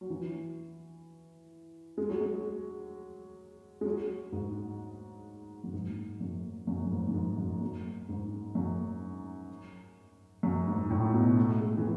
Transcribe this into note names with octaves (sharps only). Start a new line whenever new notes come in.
F#3
E3
G#3
F#3
G#3
G#3
F#3
G#2
F#2
G#2
F#2
F#2
F#2
G#2
F#2
G#2
F#2
F#2
G#2
F#2
F#2
G#2
A2
B2
A3
G#3
E3